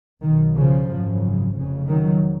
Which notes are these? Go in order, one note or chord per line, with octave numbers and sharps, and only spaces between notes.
B1 B2 D#3
C#3 F3
G#1 F#2 C#3
F1 F2 C#3
D#3 F#3